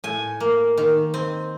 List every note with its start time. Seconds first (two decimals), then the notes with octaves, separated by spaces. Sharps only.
0.04 A2 G#5
0.40 A#3
0.77 D#3
1.14 C4